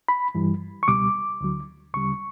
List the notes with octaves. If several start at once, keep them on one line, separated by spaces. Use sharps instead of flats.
B5
G2 E3 G3
C#6
C#2 B2 G3 D6
D2 D3 F#3
D2 C#3 G3 C#6